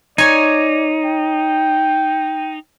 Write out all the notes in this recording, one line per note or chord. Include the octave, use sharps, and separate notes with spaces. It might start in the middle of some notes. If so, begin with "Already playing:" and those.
D#4 C#5 D5 G#5
G5